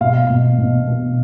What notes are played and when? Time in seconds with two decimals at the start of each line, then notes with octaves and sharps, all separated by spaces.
0.01 B2 F5
0.30 B2
0.58 B2
0.87 B2